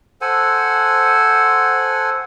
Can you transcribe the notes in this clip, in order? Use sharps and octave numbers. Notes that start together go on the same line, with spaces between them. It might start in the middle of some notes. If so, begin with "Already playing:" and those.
A4 C5 F#5 G#5